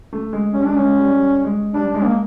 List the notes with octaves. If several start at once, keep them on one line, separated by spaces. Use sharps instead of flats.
A3
G#3
G3 C#4
G#3 D4
C#4
G#3
G3
G3
G#3
G3 D4
G#3 D4
A#3